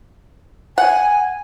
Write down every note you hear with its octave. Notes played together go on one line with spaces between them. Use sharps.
F#5 G#5